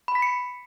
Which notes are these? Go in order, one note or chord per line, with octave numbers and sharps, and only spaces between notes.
B5
B6
C#7